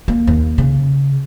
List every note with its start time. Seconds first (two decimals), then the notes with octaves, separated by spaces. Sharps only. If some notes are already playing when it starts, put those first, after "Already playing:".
0.08 A#3
0.27 D#2
0.58 C#3